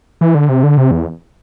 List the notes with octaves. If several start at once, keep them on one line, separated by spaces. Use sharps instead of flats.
E3
D3
C3
D3
C3
E2